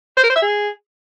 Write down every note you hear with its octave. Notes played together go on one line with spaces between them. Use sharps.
C5
A#4
C5
E5
G#4